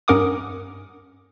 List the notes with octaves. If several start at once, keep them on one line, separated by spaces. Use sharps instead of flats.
G2 C#4 A#4 F#5 D6 D#6